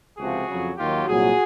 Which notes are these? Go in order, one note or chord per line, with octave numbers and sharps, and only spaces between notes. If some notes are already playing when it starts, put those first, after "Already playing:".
C#2 C3 F3 F#4 G#4
F2 C#3 F#3
D#2 D#3 F#3 F4 G4
C2 A#2 F#3 F#4 G#4